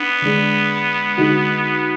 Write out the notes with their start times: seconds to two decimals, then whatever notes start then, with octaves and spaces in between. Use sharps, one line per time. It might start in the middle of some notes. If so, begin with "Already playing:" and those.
Already playing: B3 D4
0.22 D3 G#3 D4
1.18 D3 G#3 D#4 F#4